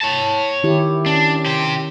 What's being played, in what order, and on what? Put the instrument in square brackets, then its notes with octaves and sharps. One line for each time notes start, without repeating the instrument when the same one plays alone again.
[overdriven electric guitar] C#5 A5
[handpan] D#3 E4 G4
[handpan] C#4 [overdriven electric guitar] D4
[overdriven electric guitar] G4 C5